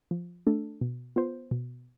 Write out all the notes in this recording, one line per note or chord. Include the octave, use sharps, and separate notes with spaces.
F3
A3 D4 A4
B2
B3 F4 C5
B2